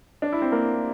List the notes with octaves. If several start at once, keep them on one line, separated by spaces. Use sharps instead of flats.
D4
E4
C4
A#3